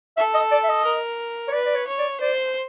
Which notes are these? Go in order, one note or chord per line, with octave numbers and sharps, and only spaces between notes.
A4 E5
D#5
D5
E5
D#5
A#4
C#5
B4 D5
D5
C#5
C#5
D5
C5 D5